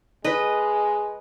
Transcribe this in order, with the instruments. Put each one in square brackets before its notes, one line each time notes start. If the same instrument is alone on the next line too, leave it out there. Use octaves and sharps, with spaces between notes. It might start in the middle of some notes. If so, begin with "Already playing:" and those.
[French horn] G#3 [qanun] B4 D#5